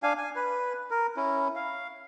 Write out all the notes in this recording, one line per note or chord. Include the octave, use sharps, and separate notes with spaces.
D4 F5 G#5
G#5
B4
A#4
C#4 E4
F5